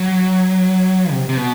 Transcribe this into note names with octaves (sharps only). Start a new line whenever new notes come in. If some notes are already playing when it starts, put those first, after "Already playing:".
Already playing: F#3
C3
C3
B2